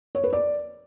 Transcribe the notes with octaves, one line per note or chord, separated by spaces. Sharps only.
C#5
B4
D5